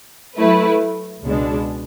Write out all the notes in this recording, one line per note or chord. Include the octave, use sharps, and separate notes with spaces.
F#3 A3 E4 B4
C#2 B2 G#3 D4